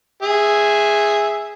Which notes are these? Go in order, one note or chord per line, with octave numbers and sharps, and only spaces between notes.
G#4 E5